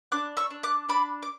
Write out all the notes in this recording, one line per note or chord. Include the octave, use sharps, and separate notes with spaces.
D4 D6 F#6
C#6 E6
D4
D6 F#6
D4 B5 D6
D6